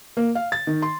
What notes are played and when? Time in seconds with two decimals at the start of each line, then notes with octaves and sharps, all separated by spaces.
0.17 A#3
0.35 F5
0.52 A6
0.67 D#3
0.82 C6